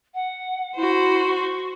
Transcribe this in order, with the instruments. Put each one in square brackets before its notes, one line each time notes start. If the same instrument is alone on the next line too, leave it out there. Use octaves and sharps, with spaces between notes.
[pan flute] F#5
[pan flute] E4 [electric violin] F#4 C5
[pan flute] C#6